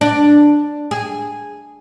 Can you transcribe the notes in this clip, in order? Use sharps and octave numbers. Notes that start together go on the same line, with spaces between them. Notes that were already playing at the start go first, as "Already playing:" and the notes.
D4
G#4